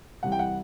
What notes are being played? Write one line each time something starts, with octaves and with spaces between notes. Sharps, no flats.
C2 C3 E3 G3 F#5
G5
F#5